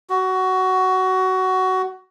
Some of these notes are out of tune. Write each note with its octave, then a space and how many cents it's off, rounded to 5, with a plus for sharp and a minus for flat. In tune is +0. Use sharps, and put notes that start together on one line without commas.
F#4 +15